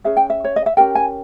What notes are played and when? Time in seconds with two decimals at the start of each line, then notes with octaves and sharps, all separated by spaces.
0.04 C#4 G#4 B4 E5
0.17 G5
0.30 E5
0.44 C#5
0.56 D#5
0.66 E5
0.77 C#4 G4 A#4 G5
0.95 G#5